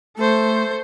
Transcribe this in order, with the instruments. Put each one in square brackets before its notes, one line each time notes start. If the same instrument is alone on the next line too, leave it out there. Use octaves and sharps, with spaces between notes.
[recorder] A3 [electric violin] A4 C5